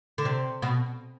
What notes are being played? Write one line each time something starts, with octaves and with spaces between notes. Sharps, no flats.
D3
C3
B2